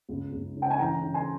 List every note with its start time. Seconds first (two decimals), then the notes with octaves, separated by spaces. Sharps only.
0.09 C#2
0.32 C#2
0.56 C#3
0.62 G5
0.70 G#5
0.79 E3 G5 A#5
1.02 C#3
1.14 G#5 C6